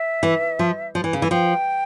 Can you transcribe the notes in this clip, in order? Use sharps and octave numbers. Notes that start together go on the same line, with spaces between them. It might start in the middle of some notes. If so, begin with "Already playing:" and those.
Already playing: E5
E3
F3
F3
E3
C#3
E3
F3 G5